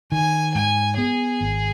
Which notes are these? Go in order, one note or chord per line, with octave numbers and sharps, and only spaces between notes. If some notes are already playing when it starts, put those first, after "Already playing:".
D#3 G#5
G#2 G#5
B3 G#4
G#1